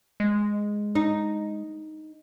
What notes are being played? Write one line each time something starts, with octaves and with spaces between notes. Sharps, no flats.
G#3
D#4